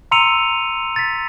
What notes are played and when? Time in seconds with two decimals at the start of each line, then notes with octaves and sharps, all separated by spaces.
0.11 A#5 C6 E6 C#7 D#7 F7
0.96 A6 B6